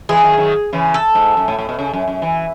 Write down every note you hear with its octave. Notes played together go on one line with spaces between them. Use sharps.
E3 G#3 G#4
D#3 F#3
D#3 F#3
C#3 E3
A4
G#2
F#2
A2
A2
B2
C#3
F#2
F#2
E3